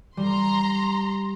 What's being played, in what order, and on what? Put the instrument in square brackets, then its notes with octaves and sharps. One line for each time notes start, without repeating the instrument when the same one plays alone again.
[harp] G3 [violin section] A#5 C6